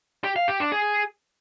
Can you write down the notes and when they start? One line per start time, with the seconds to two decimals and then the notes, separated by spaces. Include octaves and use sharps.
0.24 G4
0.36 F5
0.48 G4
0.60 D4
0.72 G#4